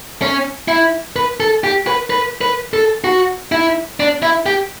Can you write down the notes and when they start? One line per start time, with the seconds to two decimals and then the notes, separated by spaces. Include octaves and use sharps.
0.22 C#4
0.68 E4
1.16 B4
1.40 A4
1.64 G4
1.87 B4
2.10 B4
2.41 B4
2.74 A4
3.04 F#4
3.52 E4
4.00 D4
4.22 E4
4.46 G4